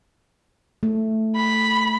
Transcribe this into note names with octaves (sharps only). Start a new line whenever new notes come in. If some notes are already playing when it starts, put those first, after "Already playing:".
A3
B5